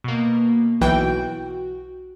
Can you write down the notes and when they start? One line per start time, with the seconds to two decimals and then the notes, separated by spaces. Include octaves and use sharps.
0.04 B2 A#3
0.81 B1 E3 F#4 G5